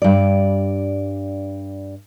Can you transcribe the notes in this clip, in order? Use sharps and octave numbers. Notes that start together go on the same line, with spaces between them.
G2 D5